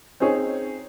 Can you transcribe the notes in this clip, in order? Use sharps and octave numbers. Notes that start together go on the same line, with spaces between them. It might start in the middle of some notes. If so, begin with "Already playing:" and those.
C4 C#4 D#4 G#4 C#5